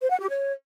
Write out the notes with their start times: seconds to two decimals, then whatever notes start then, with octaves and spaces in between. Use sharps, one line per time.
0.01 C5
0.10 F#5
0.19 G4
0.29 C#5